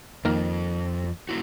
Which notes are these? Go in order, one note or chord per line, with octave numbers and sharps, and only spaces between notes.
F2 D#3 A#3 A#4
A#3 E4 F#4